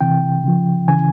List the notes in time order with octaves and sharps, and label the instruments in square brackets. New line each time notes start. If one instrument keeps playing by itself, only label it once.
[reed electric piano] C3 E3 G5
C#3 F3
C#3 E3 G#5